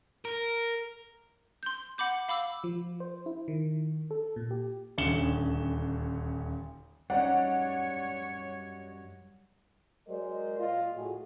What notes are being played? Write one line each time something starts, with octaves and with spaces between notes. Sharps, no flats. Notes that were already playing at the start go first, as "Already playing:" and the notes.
A#4
C6 G6
F#5 B5 D6 G6
F5 B5 D6 E6
F3
C5
E4
D#3
A4
A#2
G4
D#1 D2 C#4 C#7 E7 G7
F#2 G3 C#4 D#4 C#5 D5 F#5
F#3 G#3 A#4 C5 D5 D#5
A#2 F4 D#5
A2 F#3 G#4